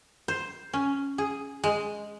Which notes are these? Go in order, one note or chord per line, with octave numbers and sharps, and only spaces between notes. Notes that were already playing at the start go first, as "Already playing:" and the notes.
C5
C#4
G#4
G#3